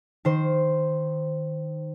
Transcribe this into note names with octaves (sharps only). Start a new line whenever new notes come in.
D#3 C5